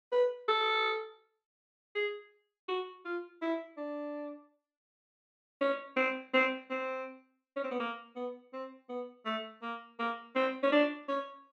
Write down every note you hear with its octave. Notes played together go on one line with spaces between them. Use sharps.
B4
A4
G#4
F#4
F4
E4
D4
C#4
C4
C4
C4
C#4
C4
B3
A#3
B3
C4
B3
A3
A#3
A#3
C4
C#4
D4
C#4